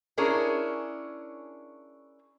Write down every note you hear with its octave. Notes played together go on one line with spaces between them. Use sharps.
C#4 D4 E4 G#4 A#4 C#5